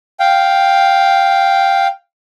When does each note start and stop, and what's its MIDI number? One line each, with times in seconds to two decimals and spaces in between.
0.20 1.87 77
0.20 1.87 79